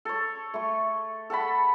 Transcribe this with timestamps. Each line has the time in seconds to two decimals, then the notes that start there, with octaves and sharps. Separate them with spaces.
0.05 A4 C#5
0.54 A3 C#6
1.30 A4 F#5 A5 B5